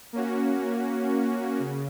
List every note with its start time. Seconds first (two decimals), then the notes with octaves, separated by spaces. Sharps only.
0.13 A#3 C#4 F#4
1.59 C#3